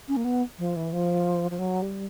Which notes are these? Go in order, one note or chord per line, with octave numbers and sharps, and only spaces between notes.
C#4
A#3
B3
F3
E3
F3
F3
F#3
G3